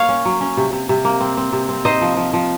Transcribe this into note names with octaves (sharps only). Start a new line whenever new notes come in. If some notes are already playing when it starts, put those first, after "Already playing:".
Already playing: A#3 C#5 F5
C#4
F#3
C#4
C3
C3
C3
A#3
C4
C4
C3
C4
D#4 C5 D#5
F3
F3
F3